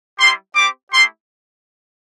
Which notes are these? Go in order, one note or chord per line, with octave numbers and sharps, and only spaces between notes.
G3 E4 G4 C6
C4 G4 D6
A3 E4 G4 C6